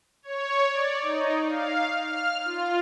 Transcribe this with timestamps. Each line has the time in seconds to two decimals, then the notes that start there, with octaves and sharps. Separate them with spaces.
0.23 C#5
0.69 D5
1.02 D#4
1.48 F5
2.01 F6
2.45 F4